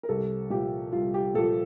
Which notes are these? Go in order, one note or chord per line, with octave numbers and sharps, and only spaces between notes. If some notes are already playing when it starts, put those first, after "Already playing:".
A#4
C2 A4
A#2 F3 G4
C2 F4
G4
A#2 F3 A4